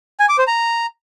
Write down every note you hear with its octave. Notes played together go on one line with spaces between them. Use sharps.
G#5
D6
C5
A#5